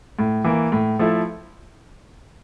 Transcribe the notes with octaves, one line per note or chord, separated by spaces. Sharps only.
A2
E3 A#3
A2
F3 A3 E4